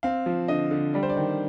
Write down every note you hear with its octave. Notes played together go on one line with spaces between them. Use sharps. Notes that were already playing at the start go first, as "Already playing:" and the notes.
C4 F5
F3
D3 D#5
D3
G3 D5
C5
D5
D#3